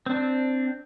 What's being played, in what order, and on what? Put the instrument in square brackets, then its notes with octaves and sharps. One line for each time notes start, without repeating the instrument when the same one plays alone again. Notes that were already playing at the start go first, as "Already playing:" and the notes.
[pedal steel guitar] C4 D4